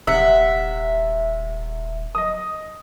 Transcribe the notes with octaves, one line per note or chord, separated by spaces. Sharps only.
D#1 C3 E5 F#5
D#5 D#6